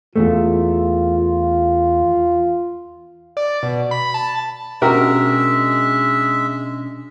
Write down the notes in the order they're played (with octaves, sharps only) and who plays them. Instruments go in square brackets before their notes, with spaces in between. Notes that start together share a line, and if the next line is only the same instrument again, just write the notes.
[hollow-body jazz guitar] E2 G2 A3 [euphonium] F4
[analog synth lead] D5
B2
B5
A5
[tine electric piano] B2 C#4 D4 [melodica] G#3 E5 [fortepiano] F#4 G4 A#4